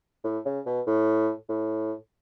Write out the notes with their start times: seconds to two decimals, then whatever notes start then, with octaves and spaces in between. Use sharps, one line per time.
0.24 A2
0.45 C#3
0.66 B2
0.87 A2
1.49 A2